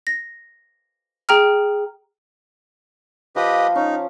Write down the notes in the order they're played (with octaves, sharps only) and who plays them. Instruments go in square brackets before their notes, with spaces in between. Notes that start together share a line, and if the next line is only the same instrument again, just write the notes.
[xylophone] A#6
G#4 G5 A#5 F6
[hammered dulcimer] F3 [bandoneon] G4 B4 D#5
[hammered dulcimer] C#4 [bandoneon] D#4